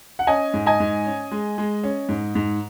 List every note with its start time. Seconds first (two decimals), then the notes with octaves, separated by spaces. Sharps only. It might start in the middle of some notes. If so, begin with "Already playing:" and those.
0.19 F#5
0.27 C#4 D#5 G#5
0.54 G#2
0.66 D#5 G#5
0.80 G#2
1.05 C#4
1.31 G#3
1.58 G#3
1.83 C#4
2.09 G#2
2.35 G#2